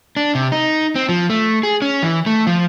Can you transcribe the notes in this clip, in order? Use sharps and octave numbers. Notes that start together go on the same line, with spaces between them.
D4
C3
D#4
C4
F3
A3
G#4
C#4
E3
A3
F3